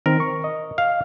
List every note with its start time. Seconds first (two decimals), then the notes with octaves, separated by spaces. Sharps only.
0.06 D#3 C4 A#4
0.20 C#6
0.44 D#5
0.78 F5